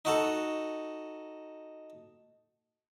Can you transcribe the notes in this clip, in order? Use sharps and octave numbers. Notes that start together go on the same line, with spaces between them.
D#4 F#4 A4